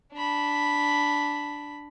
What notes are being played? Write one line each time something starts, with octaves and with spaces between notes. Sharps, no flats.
D4 B5